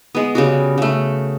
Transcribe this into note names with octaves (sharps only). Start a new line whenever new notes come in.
G#3 B3
C#3 G3 F#4
C#3 A3